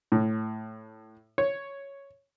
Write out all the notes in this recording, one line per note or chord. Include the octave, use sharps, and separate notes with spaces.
A2
C#5